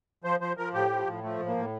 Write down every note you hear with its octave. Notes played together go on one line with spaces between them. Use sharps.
F3 C5
F3 C5
F3 A#4
A2 G4
F3
A2
F3 A3
A2
A#3
A2